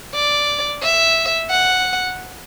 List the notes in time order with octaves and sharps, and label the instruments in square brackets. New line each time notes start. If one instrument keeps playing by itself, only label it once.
[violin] D5
E5
F#5